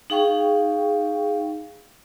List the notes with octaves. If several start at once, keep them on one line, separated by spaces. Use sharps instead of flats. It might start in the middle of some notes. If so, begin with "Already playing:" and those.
D#4 G#4 F5 G5 C#6